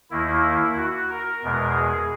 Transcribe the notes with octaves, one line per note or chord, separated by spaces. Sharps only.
D#2 D#3 A#3 E4
F#4
A#4
E2 B2 G#3
G#4